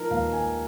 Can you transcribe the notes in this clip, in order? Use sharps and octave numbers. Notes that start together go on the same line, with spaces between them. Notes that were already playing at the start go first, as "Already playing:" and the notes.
Already playing: F3 D#4 A#4
D#2 F5
D#3 G#5